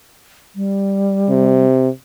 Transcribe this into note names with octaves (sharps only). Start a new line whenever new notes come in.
G3
C3